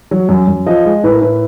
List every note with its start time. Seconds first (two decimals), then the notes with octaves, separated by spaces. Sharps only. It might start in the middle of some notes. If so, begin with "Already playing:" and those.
0.11 F#3
0.29 F#2
0.47 F#2
0.66 F3 D#5
0.85 G#3
1.03 A2 B4
1.13 A#4
1.21 A2 B4